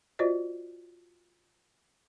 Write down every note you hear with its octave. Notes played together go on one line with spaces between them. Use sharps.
F4 F#4 C5 D5 D#5